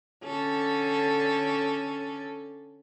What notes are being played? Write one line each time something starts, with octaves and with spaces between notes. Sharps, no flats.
D3 C#4 A4